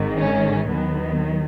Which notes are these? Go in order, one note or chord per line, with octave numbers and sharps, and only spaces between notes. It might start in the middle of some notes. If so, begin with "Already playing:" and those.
Already playing: G#1 G#2 D#3
C#4
D#2 D#3 F#3 B3